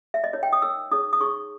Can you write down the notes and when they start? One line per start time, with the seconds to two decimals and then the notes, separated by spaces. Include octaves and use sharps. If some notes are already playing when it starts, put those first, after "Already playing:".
0.14 E5
0.24 D#5
0.33 D#4 A#4 C#5
0.43 G5
0.53 D#6
0.62 D#4 A#4 C#5 E6
0.92 D#4 G#4 C#5 D#6
1.13 D#6
1.20 D#4 G#4 C#5 C#6